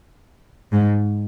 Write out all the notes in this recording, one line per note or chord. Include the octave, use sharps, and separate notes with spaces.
G#2